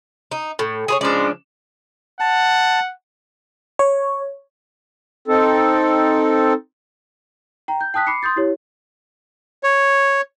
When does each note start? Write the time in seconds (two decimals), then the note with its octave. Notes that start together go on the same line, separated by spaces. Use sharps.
0.31 D#4
0.59 A2
0.88 G#4 B4 C#5
1.01 C#3 F3 G#3 D4 D5
2.20 F#5 A5
3.79 C#5
5.28 C4 D#4 A4
7.68 G5 A#5
7.81 G6
7.94 G5 A5 D#6 F#6 B6
8.07 B5 D6 C7 C#7
8.23 C6 D#6 G6 A6
8.36 E4 G4 C#5
9.63 C#5